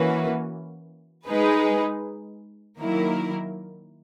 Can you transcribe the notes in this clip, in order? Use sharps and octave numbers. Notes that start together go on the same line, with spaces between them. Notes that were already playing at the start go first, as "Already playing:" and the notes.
Already playing: E3 A#3 C#4 F#4 B4
G#3 D#4 G#4 B4
D#3 F#3 A#3 E4 A#4